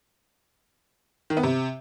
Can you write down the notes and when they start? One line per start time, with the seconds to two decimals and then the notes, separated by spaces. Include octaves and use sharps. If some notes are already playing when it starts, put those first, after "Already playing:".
1.30 D#3
1.37 B3
1.43 C3